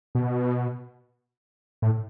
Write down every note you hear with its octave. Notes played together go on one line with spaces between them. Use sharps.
B2
A2